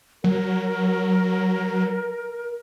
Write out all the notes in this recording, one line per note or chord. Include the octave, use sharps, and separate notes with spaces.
F#3 A#4